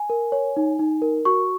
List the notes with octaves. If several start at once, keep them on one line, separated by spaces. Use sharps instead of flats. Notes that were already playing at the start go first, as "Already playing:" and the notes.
Already playing: G#5
A#4
C#5
D#4
D#4
A#4
F#4 C#6